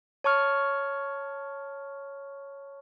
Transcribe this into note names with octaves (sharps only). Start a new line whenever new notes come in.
C#5 A5 C#6 F6